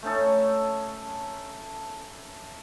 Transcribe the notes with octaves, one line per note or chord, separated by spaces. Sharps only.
A3 C#4 D#4 A4